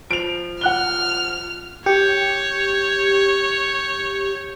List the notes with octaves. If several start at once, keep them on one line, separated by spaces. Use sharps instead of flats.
F3 D7 F7
F#5 F6 F#6 G7
G4 C#5 G6 C#7